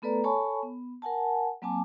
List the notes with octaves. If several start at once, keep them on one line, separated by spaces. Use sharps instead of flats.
A3 B3 A4 B4 D5 A#5
A4 C#5 G#5 A5 B5 C#6
B3
A#4 F#5 G#5 A5
F#3 A#3 C4 G#5 A5 D6